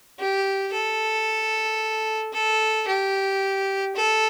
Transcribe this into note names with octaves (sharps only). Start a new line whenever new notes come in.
G4
A4
A4
G4
A4